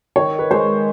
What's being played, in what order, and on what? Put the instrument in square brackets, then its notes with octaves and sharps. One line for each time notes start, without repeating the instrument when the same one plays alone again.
[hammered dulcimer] D#3 [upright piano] C#5
[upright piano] B4
[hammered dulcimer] G#3 [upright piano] C5